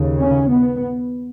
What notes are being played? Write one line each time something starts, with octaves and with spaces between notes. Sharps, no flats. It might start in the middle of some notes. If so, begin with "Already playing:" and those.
Already playing: D#2 C#3
C#4
B3